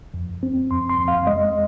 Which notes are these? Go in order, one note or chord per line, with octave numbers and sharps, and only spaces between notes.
F2
C4
F2 C6
C6
F2
F5
G#3 D#5